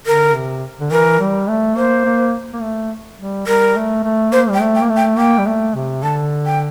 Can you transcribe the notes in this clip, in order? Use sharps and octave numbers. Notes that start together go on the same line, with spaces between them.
D3 A#4
C3
D3
E3 A#4
G3
A3
A#3 C5
A#3
A#3
A3
G3
G3 A#4
A3
A3
A#3 C5
G3 G5
A3
G5
A#3
A3
G5
A#3 G5
G3
A3
C3
D3 A5
G5